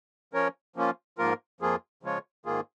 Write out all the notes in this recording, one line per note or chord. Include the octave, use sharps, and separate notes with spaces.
F3 C#4 A#4 C#5
F3 A#3 C#4 F4
G#2 F3 A#3 F4 A#4
F2 F3 A#3 F4 G#4
C#3 F3 G#3 F4 C#5
G#2 D#3 A#3 F4 G#4